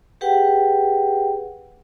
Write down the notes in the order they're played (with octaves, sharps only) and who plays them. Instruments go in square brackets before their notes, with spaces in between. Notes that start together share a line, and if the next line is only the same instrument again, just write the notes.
[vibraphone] G4 G#4 B4 F#5 G5